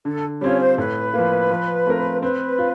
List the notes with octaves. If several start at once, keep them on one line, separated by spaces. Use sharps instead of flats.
D3 A4
G3 C4 C#4 F4 C#5
C5
A2 B4
F3 A#3
F3
A3 C4 F4 A#4
C4 B4
F4